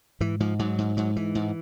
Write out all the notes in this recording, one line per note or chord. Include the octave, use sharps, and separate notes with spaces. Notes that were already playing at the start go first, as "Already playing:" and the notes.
G#2 E3
G#2 F3
G#2 F#3
G#2
G#2 F#3
G#2 E3
G#2